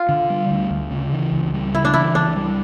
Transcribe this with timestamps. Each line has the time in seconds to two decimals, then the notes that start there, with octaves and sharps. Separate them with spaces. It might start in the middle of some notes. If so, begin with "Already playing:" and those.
Already playing: F4
0.09 D3
0.30 G3
0.51 D2
0.71 D2
0.91 C#3
1.12 E3
1.32 C#2
1.54 G3
1.74 C#3 E4
1.85 D4
1.94 E3 E4
2.15 C#2 D4
2.36 G3